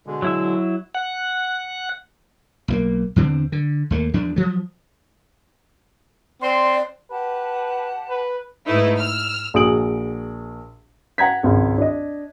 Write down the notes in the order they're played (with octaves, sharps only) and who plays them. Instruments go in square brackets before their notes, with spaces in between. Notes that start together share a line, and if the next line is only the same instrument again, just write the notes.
[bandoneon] B2 D3 G#3
[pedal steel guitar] F#3 E4 E5
[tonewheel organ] F#5
[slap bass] B1 G3 A#3
E2 D3 C4
D3
D#2 A3 A#3
E2 F3 D4
F3 F#3
[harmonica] C4 [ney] D5 [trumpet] C6
[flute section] G4 F#5 A5 [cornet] B4
[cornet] B4
[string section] G#2 A3 D#4 E4 B4
E6 F6
[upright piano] A#1 F#4 G#4 D#6 D7 F#7
F#5 A#5 G#6 B6
G#1 C#2
D4 D#5